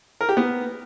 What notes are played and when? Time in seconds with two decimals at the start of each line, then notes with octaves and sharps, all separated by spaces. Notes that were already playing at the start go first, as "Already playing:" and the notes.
0.21 A#4
0.29 G4
0.37 B3